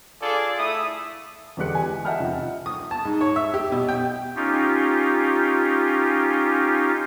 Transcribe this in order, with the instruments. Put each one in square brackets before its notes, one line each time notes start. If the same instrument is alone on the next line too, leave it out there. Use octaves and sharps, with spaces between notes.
[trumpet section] D4 F4 G#4 A4 D5 G#5
A3 E4 A4 E5 D#6
[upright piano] E2 D3 G#3 G4 F#6 C#7
G#5
D#5 E5 F#5 G5 A5 F6
F1
[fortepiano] D#6
A5
G#2
C#5
E5
G4
B2
G5
[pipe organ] C#4 D#4 F4 G4